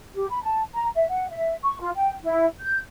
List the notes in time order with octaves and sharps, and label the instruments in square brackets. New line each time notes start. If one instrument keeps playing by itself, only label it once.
[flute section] G4
B5
A5
A#5
E5
F#5
E5
C#6
F4
G5
E4
G6